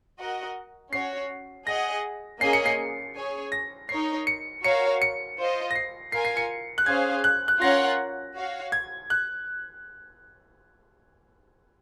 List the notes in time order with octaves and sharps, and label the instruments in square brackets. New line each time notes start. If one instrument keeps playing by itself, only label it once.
[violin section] F#4 A#4 D#5 F#5
[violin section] C#4 F#4 C#5 [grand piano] C7
[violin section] G#4 D#5 F#5 [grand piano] A#6
[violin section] A#3 C#4 G#4 D#5 G#5 [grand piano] C7
[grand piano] C#7
C7
[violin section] C#4 G#4 C#5 G#5
[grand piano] A#6
[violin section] D#4 A#4 C#5 [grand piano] C7
[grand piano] C#7
[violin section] F#4 A#4 C#5 F5 [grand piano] C#7
[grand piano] C#7
[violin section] F4 C5 D#5
[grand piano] A#6
C7
[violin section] F4 A#4 F5 G#5 [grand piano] C7
[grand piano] C7
C#7
F#6
[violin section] C#4 G#4 C5 F5 [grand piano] G#6
[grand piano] F#6
F#6
[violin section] C#4 F4 A#4 C#5 F#5 [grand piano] A#6
[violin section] F#4 C#5 F5
[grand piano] G#6
F#6